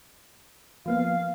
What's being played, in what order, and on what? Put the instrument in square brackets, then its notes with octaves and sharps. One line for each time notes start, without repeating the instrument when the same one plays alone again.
[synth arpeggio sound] F3 A#3 B3 [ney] F5